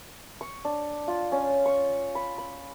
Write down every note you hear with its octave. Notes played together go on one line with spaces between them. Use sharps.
C#6
D4
F4
C#4
C#6
B5
B5